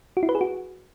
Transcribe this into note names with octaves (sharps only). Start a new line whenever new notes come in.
F#4
E4
B4
G#4
F#4